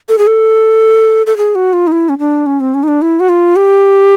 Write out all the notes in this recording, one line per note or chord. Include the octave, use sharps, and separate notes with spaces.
A4
G#4
A4
A4
G#4
F#4
F4
D#4
E4
C#4
D4
C#4
C4
C#4
D#4
D4
E4
F#4
F4
G4